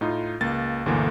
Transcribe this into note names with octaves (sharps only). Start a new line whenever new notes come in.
A2 D#4 F4
C#2 A#3 A6
G1 D2 B2 D3 E3 A#3